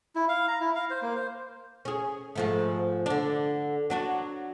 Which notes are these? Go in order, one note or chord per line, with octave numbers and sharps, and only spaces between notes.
E4
F5
A#5
E4
F5
C5
A#3
C5
C#4 G#4
G#2 F3 A3
D3 D4
F#3 D4 F#4